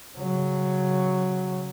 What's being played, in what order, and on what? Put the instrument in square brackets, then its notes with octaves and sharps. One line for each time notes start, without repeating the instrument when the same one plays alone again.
[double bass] C#3 F#3